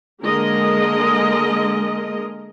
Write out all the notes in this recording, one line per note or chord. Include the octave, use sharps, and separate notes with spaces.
D3 G#3 A#3 G#4 A#4 D#5